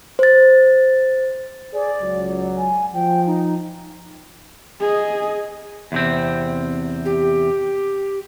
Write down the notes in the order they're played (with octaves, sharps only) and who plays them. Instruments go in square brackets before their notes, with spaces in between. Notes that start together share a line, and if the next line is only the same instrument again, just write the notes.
[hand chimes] C5 A6
[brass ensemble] G#4 [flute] D5
[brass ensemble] C#2 F#3
[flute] G#5
[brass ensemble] F3 [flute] G5
[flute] D#4
[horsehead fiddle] G#4 D#5
[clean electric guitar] E2 C3 C4
[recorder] G4